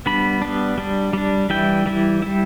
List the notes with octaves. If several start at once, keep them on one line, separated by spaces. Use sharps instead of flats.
G3 B3 D4 B5
G3 B3 D4
G3 D4
G3 D4
E3 G3 E4 G5
E3 G3 E4
G3 E4